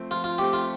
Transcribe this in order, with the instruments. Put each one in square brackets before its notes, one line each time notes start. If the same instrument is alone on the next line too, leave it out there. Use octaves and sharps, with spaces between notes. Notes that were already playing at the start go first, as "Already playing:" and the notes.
Already playing: [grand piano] F3 A3 C4
[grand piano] F3 [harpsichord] F4
[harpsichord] F4
[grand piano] A3 C4 [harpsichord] G4
[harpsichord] F4